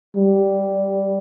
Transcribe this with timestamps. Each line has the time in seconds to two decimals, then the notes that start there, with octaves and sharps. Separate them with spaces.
0.16 G3